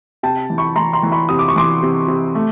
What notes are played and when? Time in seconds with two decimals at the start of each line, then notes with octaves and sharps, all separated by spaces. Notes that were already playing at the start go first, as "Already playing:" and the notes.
0.23 C3 G5 A5
0.50 E3
0.58 B5 C#6
0.76 E3 A#5 C6
0.93 A#5 C6
1.03 E3
1.12 B5 C#6
1.29 C3 D#6
1.39 D6
1.48 C#6
1.56 E3 C6 D6
1.82 C3
2.08 C3
2.35 A3